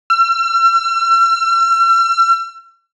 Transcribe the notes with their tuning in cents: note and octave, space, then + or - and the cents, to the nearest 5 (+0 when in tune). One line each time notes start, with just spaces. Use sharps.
E6 +45